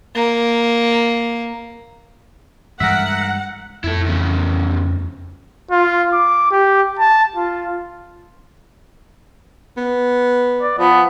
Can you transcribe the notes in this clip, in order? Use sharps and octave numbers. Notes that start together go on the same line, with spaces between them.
A#3
G2 E3 G#3 A#4 E5 F#5
F2 E4 A4
E2 C#3
F4
D6
G4
A5
F4
B3
D5
F3 B3